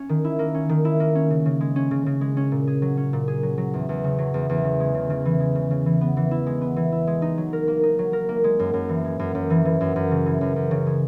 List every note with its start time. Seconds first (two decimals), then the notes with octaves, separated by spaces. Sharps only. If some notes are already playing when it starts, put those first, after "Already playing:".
Already playing: C#4
0.09 D#3
0.24 E4
0.39 A#3
0.54 C#4
0.69 D#3
0.85 E4
1.00 A#3
1.15 C#4
1.30 C#3
1.46 C#3
1.61 G#3
1.76 C#4
1.91 C#3
2.06 C#3
2.21 G#3
2.37 C#4
2.52 A#2
2.67 G#4
2.82 F#3
2.97 C#4
3.13 A#2
3.28 G#4
3.43 F#3
3.58 F#3
3.74 E2
3.89 E2
4.04 C#3
4.18 F#3
4.34 E2
4.49 E2
4.64 C#3
4.80 G#3
4.95 C#3
5.10 C#3
5.25 E3
5.40 G#3
5.55 C#3
5.71 C#3
5.86 E3
6.01 B3
6.17 E3
6.31 E4
6.46 G#3
6.61 B3
6.76 E3
6.92 E4
7.07 G#3
7.22 D#4
7.38 F#3
7.53 A#4
7.68 A#3
7.83 D#4
7.99 F#3
8.13 A#4
8.29 A#3
8.44 G#3
8.59 F#2
8.74 F#2
8.89 E3
9.05 G#3
9.19 F#2
9.35 F#2
9.50 E3
9.65 E3
9.81 F#2
9.96 F#2
10.11 C#3
10.26 E3
10.41 F#2
10.56 F#2
10.71 C#3
10.87 G#3